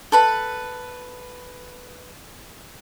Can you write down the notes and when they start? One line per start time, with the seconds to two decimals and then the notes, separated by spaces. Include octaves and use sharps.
0.12 A4 B4 B5